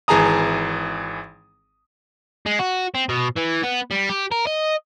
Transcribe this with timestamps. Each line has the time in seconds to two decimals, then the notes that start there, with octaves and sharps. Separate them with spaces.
0.08 G#1 E3 G#4 A5 A#5 D#6
2.46 G#3
2.59 F#4
2.95 C4
3.09 B2
3.36 E3
3.63 B3
3.91 G3
4.09 G4
4.32 A#4
4.47 D#5